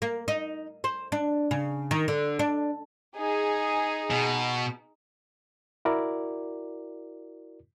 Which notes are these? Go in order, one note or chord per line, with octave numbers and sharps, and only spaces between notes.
A#3
D#4
C5
D4
C#3
D#3
D3
D4
D#4 G#4
B2
E4 F#4 A#4 D5